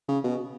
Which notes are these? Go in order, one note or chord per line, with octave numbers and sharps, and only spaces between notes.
C#3
B2